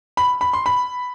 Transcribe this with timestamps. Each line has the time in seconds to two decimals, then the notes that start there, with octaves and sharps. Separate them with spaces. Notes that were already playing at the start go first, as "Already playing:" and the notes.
0.17 B5
0.41 B5
0.53 C6
0.66 B5